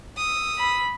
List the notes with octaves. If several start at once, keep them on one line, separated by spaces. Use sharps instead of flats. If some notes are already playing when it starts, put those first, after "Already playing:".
D#6 E6
B5